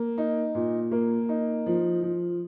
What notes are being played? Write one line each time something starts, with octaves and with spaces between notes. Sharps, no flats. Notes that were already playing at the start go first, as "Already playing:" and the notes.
Already playing: A#3
D#4
A#2
A#3
D#4
F3
F3